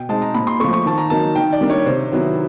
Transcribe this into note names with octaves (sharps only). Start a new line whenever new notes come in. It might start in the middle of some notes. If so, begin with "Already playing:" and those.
Already playing: B2 G5
G#3 C4 D#4 A5
A#5
A#2 B5
C6
F3 A3 C#6
C#6
D#3 A5
A#5
F#3 A#3 D#4 A5
D#3 G5
D5
G3 A#3 D4
C#5
C3 C5
D#3 F#3 B3 E4